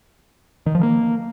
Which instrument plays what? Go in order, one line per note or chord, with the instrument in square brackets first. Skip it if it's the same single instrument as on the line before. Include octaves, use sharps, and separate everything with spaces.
[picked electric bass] D#3
F3
A#3